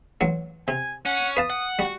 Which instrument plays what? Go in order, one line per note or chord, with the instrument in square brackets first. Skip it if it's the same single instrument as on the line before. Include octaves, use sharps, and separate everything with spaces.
[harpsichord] A1 F#3
[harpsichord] C3 [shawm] G#5
[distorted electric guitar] C#4 [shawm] F#5
[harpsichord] B4 F5 A5 [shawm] D#6
[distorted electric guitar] F#5
[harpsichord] G3 [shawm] F#4